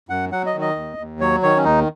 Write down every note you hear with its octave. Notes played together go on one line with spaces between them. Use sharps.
F#2 F#5
F#3 F#5
D#5
D#3
D#5
D#2
D#2
F#3 C#5
D#3 C#5
C#4
D#2 D#4